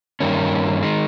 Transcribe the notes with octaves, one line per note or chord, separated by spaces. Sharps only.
G2 D#3 A#3 C#4
D#3 G#3